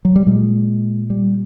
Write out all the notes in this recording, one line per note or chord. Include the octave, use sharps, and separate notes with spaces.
F#3
G3
A#2 G#3
G3